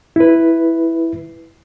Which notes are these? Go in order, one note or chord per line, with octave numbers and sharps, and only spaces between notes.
E4 B4